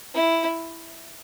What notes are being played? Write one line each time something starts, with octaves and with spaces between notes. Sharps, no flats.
E4